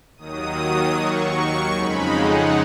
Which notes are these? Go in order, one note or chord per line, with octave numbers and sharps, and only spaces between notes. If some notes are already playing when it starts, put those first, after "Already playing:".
D#2 D#3 F#3 D#6
C#6
F2 C#3 G#3 D#4 B5
F#5